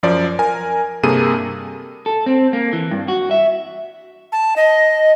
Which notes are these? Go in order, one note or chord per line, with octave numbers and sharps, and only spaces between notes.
F#2 F3 D5
A#4 G#5
G2 C3 A#3 G#4 A4 D#7
A4
C4
A#3
E3
G2
F#4
E5
A5
D#5